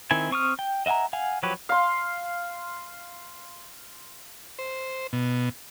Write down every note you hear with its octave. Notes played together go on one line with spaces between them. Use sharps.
D#3 C4 E4 G#5
C4 C#6 D#6 F6
G5
D#5 E5 F#5 G#5 A#5
F5 F#5 G#5
F3 F#3 G4 B4 C#5
F5 C6
C5
B2